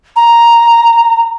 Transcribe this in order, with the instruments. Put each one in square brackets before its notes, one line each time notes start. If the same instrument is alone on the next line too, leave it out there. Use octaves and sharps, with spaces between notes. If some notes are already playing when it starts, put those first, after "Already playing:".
[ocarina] A#5